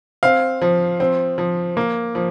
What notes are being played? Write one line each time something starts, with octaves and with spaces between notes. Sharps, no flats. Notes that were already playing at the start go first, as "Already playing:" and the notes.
C4 F5
F3
C4
F3
A#3
F3